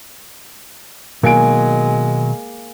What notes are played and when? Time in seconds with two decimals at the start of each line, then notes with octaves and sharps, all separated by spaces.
1.23 B2 D#3 F#3 G#3 A#3 G#5 D7